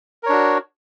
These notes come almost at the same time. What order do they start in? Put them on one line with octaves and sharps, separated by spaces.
A#4 C#5 D4 F#4